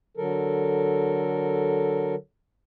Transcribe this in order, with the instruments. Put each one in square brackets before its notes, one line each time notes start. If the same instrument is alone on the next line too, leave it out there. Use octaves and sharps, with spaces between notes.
[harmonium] D3 F#3 A4 A#4